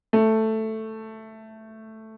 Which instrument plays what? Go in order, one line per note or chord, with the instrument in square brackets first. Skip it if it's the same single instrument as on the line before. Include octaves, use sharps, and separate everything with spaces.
[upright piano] A3